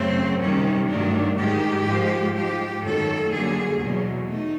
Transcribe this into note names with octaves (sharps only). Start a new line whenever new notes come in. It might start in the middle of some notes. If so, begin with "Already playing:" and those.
Already playing: F#2 C#3 F#3 A3 C4
C3 D#3 G3 C#4
G2 D#3 F#3 A3 D4
G#2 D#3 G#3 G4
G#2 F3 G#3
G#2 F3 G#3 G4
F#2 D#3 F#3 A3 A4
F#2 D3 G3 A#3 G#4
E2 B2 F#3
A3 D#4